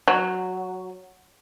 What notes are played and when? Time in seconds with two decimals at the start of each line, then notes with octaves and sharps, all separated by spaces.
0.08 F#3